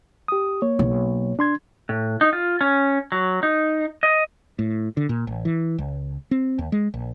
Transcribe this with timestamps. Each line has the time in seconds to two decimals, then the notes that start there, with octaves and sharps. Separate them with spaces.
0.28 G4 D#6
0.62 A#3 C#5
0.79 B1
1.39 D4 C6 G#6
1.89 A2
2.21 D#4
2.33 F4
2.61 C#4
3.12 F#3
3.43 D#4
4.03 D#5
4.59 A2
4.97 D3
5.09 A#2
5.27 A1
5.45 E3
5.78 C#2
6.31 C4
6.59 D#2
6.72 G#3
6.94 A#1